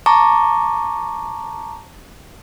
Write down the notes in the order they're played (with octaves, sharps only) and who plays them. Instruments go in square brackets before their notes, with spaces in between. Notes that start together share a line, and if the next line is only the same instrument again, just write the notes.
[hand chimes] A5 A#5 C#6 D6